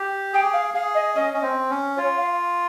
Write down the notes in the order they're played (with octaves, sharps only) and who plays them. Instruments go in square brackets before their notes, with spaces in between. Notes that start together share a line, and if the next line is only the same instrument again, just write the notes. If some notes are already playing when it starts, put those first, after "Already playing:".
Already playing: [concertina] G4
[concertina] G#4 [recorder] G5
[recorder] F5
[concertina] G#4 [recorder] F5
[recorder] D#5
[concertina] C#4 [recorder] D#5
[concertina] C#4
C4
C#4
[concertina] F4 [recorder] C#5
[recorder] F5